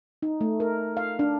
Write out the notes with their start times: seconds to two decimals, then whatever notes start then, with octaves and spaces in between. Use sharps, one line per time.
0.22 D#4
0.41 A3
0.60 A#4
0.97 F5
1.19 D4